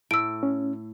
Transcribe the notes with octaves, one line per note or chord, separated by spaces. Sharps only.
A2 E6 D7
C#4